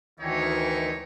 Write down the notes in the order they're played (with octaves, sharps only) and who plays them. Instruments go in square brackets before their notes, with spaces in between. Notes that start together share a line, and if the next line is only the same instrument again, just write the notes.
[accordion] D2 D#3 E3 [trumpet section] D#4 E4 C#5